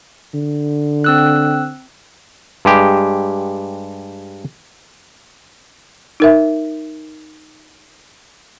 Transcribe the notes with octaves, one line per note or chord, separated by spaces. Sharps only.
D3
C4 E6 F#6
G2 G#3 G4
D#4 A#4 E5